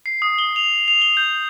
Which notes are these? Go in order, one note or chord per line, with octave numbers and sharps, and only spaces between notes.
C7
D#6
G7
F7
F7
G7
G6